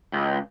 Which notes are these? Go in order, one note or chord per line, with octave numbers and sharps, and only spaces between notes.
C#2